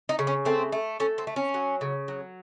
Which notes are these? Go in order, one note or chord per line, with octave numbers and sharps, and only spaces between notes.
D#4
C#3
C#4
A3 C4
A3
A3 C#4
C4
A3
C#4
F#3
C#3
F#3